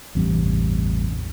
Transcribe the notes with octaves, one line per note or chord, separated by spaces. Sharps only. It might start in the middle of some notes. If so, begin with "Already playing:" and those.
A1 E2 G2 C3